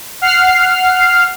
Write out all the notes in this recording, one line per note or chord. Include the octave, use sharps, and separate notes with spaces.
F#5 F6 C7